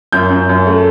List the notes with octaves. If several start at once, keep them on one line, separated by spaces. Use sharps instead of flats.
F#2 G6
F#2
F#2
A3